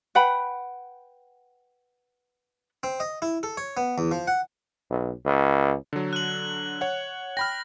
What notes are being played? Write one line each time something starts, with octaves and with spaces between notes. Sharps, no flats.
B4 F#5 G5 B5
C4
D#5
E4
A4
C#5
B3
E2
F3
F#5
B1
C#2
D3 F#3
F#6 F#7
C#5 F#5
G5 B5 F6 A#6